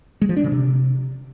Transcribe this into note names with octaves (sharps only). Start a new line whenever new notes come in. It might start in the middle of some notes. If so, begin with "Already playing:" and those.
G#3
F3
D4
C#3
C3